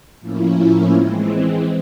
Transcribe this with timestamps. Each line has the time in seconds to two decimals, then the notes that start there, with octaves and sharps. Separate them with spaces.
0.20 A2 F3 A#3 C#4 E4
0.92 E3 G#3 C4